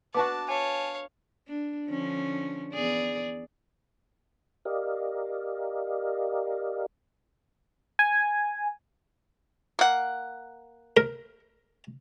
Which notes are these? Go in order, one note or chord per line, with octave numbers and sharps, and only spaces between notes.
B3 D4 F#4 A5 D6
C#5 F5 G#5 A5
D4
D3 F3 C#4
E2 G#4 D5
G4 A#4 D5 D#5 F5
G#5
A#3 F#5
A#4